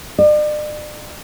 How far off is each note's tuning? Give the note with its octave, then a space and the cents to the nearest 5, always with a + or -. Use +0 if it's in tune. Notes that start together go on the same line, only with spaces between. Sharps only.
D5 +40